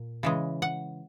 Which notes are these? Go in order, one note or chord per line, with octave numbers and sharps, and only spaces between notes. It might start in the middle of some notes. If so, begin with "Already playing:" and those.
Already playing: A#2
C#3 E3 G#3
F#5